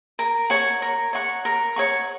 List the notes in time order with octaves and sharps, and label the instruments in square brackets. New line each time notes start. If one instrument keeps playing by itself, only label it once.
[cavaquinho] A#4
C#5 F#5 C#6
A#4
C#5 F#5 C#6
A#4
C#5 F#5 C#6